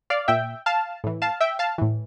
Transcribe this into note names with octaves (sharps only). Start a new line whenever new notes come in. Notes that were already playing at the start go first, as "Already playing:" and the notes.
D5 F5
A#2 E5 G5
F5 A5
A2 E3
F5 A5
E5 G5
F5 A5
A2 E3